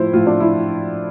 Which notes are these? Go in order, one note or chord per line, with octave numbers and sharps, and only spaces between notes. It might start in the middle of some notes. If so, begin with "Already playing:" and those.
Already playing: A2 F3 E4 C5
A2 F3 F4
D4
E4